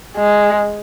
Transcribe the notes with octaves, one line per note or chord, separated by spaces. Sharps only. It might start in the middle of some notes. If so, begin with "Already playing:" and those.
G#3